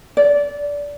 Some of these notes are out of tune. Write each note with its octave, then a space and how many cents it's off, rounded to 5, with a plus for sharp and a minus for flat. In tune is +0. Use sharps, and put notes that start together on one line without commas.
D5 -20